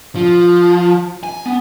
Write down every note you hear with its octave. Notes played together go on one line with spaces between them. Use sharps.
F3
G#5
B3